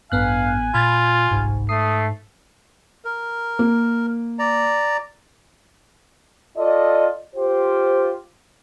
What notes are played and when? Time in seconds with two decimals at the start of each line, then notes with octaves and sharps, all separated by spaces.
0.12 A1 G2 B3 F5 G#5 F#6
0.74 A#2 F4 B5 G#6 A6
1.31 G1 C2 G#2
1.69 A3 D#6 C7
3.05 A#4
3.59 A#3
4.39 D5 A#5
6.57 F4 A4 D5 D#5
7.36 F4 G4 C5